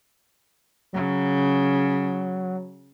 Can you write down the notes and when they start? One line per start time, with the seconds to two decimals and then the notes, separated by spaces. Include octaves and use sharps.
0.93 C#3 F#3